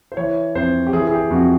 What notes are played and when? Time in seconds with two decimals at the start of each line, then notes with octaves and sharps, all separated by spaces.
0.12 C5
0.17 E3 C#5
0.55 F2 C5
0.87 G4
0.93 E3 G#4
1.07 G#4
1.13 G4
1.30 F2 F#4